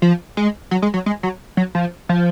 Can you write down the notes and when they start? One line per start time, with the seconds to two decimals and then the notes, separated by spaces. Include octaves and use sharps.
0.02 F3
0.37 G#3
0.71 F#3
0.82 G#3
0.94 F#3
1.06 G#3
1.23 F#3
1.57 F#3
1.75 F3
2.09 F3